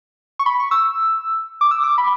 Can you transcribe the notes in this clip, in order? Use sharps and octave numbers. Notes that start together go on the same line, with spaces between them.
C#6
B5
C#6
E6
D6
E6
D6
B5